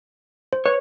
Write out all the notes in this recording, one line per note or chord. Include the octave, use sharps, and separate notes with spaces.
C5
B4 C#5